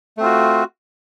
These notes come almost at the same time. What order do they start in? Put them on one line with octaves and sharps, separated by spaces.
A3 C4 F4 F#4